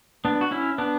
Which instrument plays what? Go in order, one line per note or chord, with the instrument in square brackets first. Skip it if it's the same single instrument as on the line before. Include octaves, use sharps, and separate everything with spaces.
[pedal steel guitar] B3 D4
F#4
C#4 E4
B3 D4